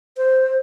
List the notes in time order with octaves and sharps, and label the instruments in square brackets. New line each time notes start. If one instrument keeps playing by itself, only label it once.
[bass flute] C5